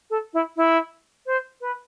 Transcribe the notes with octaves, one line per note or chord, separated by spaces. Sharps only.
A4
E4
E4
C5
B4